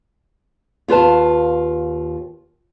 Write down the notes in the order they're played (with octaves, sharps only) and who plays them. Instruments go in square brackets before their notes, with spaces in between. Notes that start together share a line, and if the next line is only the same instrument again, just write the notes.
[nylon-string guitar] D#2 F4 B4 A5